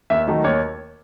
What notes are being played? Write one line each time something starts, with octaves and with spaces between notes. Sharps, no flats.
D#2 E5
D#3 F#3 A3 D#4
D#2 C#5